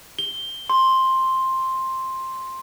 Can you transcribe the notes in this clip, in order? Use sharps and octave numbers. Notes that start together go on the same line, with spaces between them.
G7
C6